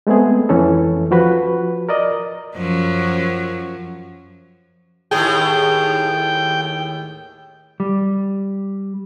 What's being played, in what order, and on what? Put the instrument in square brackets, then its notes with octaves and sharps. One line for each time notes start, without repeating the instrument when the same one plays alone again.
[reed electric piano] G#3 A3 B3 C4 G#4
F2 E3 C#4 A4
F3 F#4 B4
A#4 D5 D#5
[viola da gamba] F#2 F3 F#3
[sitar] D#2 A2 G#4 [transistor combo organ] G5
[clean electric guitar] G3